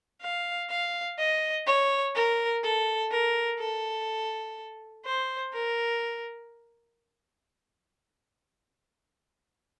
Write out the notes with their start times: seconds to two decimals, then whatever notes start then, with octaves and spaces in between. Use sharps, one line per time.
0.22 F5
0.70 F5
1.19 D#5
1.67 C#5
2.15 A#4
2.64 A4
3.11 A#4
3.60 A4
5.05 C5
5.53 A#4